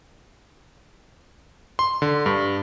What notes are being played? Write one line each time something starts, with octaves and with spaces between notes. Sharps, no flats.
C6
D3
G2